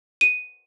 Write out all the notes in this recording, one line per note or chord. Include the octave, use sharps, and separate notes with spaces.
D#7